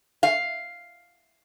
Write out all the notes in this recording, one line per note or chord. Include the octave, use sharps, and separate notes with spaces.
F5